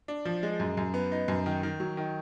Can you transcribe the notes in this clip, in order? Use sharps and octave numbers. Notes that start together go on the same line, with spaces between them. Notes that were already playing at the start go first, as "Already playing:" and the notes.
D4
F3
G#3
F#2
F#2
B3
D#4
F#2
D#3
D#3
F#3
D#3